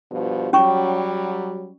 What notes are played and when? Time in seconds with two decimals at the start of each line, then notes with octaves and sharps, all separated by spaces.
0.11 G2 B2 F3
0.53 F#3 G3 C#4 C#6